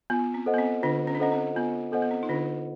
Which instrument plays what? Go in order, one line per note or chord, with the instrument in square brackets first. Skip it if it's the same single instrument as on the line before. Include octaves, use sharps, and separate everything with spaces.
[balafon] B3 [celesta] F4
[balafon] C4
[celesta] A4 C5 D#5 F#5
[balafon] B3
C4
[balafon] D3 D4 [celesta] F4
[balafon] C#4
D4
[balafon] C#4 [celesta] A4 C5 D#5 F#5
[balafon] C4
[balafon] B3 [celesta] F4
[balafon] B3 [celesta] A4 C5 D#5 F#5
[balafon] B3
C4
D#4
[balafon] D3 D4 [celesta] F4